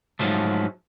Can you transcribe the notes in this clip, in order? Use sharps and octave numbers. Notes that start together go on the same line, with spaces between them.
G#2 F3 F#3 A3